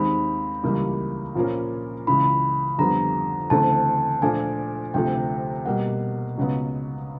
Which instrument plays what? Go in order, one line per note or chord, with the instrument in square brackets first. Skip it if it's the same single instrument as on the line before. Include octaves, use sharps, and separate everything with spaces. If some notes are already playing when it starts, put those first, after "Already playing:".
Already playing: [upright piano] D#2 D#3 G#3 C4 [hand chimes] B5
[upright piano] C#2 C#3 E3 G3 A#3
A#2 F3 A#3 C#4
[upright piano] C#2 C#3 E3 [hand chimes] B5
[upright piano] F2 D3 G3 B3 [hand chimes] A#5
[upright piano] D2 C#3 E3 A3 C4 [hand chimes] A5
[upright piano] A#2 F3 A3 D4 [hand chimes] G#5
[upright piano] D2 C3 F3 A3 [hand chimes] G5
[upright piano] B2 G3 A#3 [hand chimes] F#5
[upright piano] C#2 C#3 F#3 B3